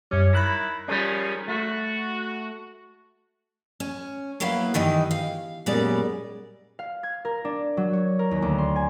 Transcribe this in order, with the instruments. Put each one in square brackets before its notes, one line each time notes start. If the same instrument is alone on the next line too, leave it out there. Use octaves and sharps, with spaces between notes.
[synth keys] F#2 G3 [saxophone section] C#4
[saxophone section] D#3 E4 [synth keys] B5 F#6 A#6
[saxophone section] D#3 F3 G#4 [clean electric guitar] G3 C#4
[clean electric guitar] A3 [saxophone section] F#4
[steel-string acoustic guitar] C#4
F#3 A#3 B3 E4 F5
G2 D#3 E3 D#4
F5
F#2 A#2 G3 G#3 B3 D5
[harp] F5
G#6
A#4
D4
F#3
C#5
A#4
D#2
D2
C6
G#5